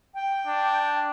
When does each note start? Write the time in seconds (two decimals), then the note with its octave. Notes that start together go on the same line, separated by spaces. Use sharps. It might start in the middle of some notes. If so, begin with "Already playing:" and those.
0.15 G5
0.47 D4